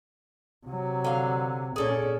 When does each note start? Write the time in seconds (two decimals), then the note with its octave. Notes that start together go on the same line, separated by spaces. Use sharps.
0.67 C3 F#3
1.04 D3 F5
1.76 A#2 C#4 G#4 A4 D5